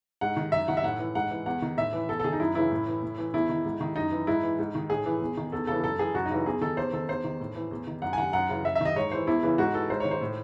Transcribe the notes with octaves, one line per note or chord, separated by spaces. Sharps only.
G#2 F#5
D#3
F#2 E5
D#3 F#5
E5
A2 F#5
E3
G#2 F#5
E3
E2 F#5
D#3
A2 E5
E3
E2 A4
A4
D#3 G#4
D#4
F#2 E4
C#3 E3 E4
A2
E3
A2
E3
E2 E4
D#3
G#2
D#3
F#2 D#4
E3
G#2 E4
E3
G#2
D#3
A2 G#4
E3
E2
D#3
E2 A4
C#3 E3 A4
F#2 A4
E3 G#4
F#2 F#4
D#4
C#3 E3
E2 G#4
D#3 A4
E2 C5
D#3 A4
E2 C5
D#3
A2
E3
E2
D#3
F#2 F#5
G#5
D#3 F#5
F#2 F#5
C#3 E3
F#2 E5
E5
D#3 D#5
G#2 C#5
E3 C5
E2 E4
C#3 E3
G#2 F#4
E3 A4
G#2 C5
C#5
D#3
C5
A2